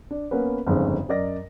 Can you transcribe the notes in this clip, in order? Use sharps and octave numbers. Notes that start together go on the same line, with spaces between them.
D4
A#3 B3 C#4 A#4 B4
G1 F2 G#2 C#3
F#2 A#4 D5 D#5 A#6